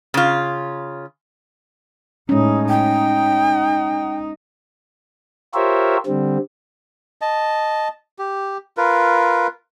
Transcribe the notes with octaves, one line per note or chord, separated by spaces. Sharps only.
C#3 F4
A2 G#3 C#4 D#4
D#4 G5
F4 G4 A#4 C5 C#5 E5
D3 G3 C4
D#5 A5
G4
F4 A#4 B4